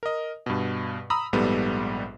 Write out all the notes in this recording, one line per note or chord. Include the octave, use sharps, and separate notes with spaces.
A#4 D#5
G2 B2
A#5 B5 D#6 E6
A#1 G#2 G3 B3 A4